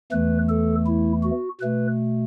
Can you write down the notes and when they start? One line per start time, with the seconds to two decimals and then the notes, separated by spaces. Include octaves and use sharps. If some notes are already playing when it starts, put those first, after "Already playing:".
0.12 E2 E3 A3 B4
0.49 A4
0.86 E4
1.23 F#4
1.61 B2 A3 B4